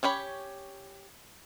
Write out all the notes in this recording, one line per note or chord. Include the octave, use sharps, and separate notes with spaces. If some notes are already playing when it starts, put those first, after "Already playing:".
C#4 G4 C#5 B5